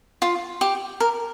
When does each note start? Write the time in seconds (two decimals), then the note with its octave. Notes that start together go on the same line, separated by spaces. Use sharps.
0.22 F4
0.61 G4
1.00 A#4